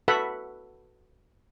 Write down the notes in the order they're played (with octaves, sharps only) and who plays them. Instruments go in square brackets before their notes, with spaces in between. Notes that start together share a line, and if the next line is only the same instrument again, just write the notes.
[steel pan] F#4 A4 B4 E5 F#5 B5